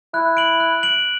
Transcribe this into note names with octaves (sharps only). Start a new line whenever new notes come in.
E4 F#6
D7 F#7
F#6
D7 F#7